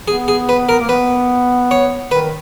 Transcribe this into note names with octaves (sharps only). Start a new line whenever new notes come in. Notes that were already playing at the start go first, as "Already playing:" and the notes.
B3 G#4
G#4
B4
A#4
A#3
B3 B4
C#5
D#3 B4